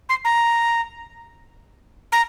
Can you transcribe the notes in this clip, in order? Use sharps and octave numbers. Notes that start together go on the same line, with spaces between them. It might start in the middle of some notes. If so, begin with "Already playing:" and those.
C6
A#5
A#5